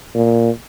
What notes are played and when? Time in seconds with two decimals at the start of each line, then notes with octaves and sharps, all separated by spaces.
0.15 A#2